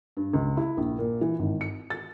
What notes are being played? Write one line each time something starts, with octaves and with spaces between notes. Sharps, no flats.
G2
C#2
E4
A#1
A#2
E3
G#1
C#7
A6